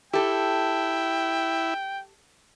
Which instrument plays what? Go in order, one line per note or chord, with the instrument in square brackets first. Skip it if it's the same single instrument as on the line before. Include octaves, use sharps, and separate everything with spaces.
[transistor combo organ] E4 [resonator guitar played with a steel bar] G4 A4 [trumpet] G5